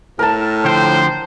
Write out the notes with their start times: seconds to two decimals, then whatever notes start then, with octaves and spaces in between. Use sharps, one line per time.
0.19 A2 A#4 A5
0.65 D3 F3 C5 G5